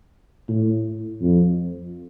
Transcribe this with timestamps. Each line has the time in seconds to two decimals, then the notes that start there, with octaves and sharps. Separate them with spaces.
0.49 A2
1.21 F2